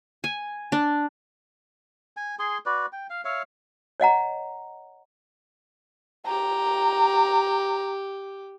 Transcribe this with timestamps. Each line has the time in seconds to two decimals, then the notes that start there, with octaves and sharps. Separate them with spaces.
0.24 G#5
0.72 D4
2.17 G#5
2.39 G#4 G#5 C6
2.66 F#4 B4 D5
2.93 G5
3.10 F5
3.25 C#5 E5 F5
4.00 C#5 D#5 F#5 A#5
6.26 G4 A#5